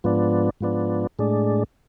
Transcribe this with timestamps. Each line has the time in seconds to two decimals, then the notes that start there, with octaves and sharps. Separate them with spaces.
0.04 G#2 F3 B3 D4
0.61 G#2 F3 B3 D4
1.19 A2 G#3 D4